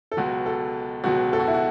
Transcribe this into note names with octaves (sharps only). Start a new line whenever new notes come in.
A4
C#2 B2 F#3 F#4
A4
C#2 B2 F#3 F#4
A4
F#4
E4
F#4